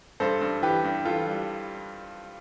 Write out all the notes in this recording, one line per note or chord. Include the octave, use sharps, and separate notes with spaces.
G2 A4 C5
G2
E3 G4 B4
G2
E3 F4 A4
G3